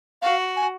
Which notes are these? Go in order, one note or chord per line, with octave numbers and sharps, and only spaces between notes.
F#4 F5
G#5